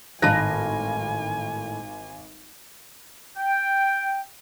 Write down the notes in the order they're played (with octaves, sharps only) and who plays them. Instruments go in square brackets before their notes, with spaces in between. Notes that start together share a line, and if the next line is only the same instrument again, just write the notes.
[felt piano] G#1 F5 A#6 [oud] A2 D#4 [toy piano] C5 A5 [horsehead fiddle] G#5
[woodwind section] G5